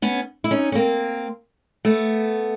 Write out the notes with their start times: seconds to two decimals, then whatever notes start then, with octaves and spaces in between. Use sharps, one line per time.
0.02 B3 C#4
0.44 E4
0.51 C#4 D#4
0.72 C#4
0.75 A#3 C4
1.85 A3 B3